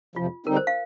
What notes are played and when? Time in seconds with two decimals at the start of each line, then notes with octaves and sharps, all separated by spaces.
0.16 F2 C3 F3 F4
0.46 D3 G3 C4 D#4 A#4
0.57 C5
0.67 F5